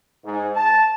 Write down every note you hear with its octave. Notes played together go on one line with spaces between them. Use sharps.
G#2
A5